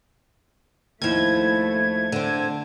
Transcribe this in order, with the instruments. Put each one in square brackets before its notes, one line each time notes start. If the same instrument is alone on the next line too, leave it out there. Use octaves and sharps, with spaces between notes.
[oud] D#2 F3 [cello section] A3 [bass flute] E4 [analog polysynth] G#6
[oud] D3 C4 [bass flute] D4